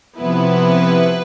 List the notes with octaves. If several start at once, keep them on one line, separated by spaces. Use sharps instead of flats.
C3 F3 B3 E4 B4